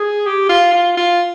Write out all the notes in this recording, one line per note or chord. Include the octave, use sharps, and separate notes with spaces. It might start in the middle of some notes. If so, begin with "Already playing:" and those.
Already playing: G#4
G4
F4
F4
F4